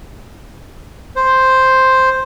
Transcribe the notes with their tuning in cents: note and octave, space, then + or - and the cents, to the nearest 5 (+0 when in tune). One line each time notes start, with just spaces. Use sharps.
C5 +0